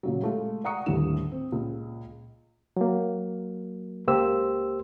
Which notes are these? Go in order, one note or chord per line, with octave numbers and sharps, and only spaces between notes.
A#2 C#3 F#3
G#3 A3 F4
D5 F#5 A#5 C#6 D#6 C#7
D#1 D#2 A2 D3 E7
C4
C#2 A#2
F#3 A#3
C#2 A#3 G4 C5 E6